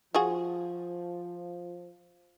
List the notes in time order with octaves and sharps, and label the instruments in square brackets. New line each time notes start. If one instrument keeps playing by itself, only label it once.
[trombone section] F3 [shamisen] F4 F#4 G#4